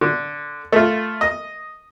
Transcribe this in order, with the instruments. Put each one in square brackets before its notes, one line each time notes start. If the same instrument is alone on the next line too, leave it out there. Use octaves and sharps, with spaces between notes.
[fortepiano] D3
A3 F4
D#5 D#6